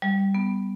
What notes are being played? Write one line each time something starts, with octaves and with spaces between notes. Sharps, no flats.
G3
B3